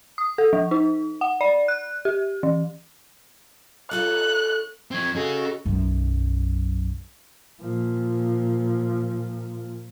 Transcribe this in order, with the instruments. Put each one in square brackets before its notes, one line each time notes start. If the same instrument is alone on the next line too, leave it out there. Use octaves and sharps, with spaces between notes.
[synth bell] D#6
A4
F3
D#4
F#5
D5
F#6
G4
E3
[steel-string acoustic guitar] C#4 F4 A4 [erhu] F#6
[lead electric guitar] F2 C4 [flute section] C#6 G#6
[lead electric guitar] C#4 G#4 [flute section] F#4 A4 D#5
[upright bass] B1 F#2
[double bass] A#2 F3